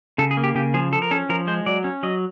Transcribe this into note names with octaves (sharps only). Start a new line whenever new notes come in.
C#3 A4
G#4
A#3
G4
C#3 G4
F3 G#4
F3 A4
A#4
C#4 A4
F3 A#4
G#3 C5
F#3 D5
C#4
F#3 D#5